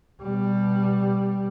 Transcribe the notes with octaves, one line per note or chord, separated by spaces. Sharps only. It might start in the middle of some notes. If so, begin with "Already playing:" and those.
B2 G3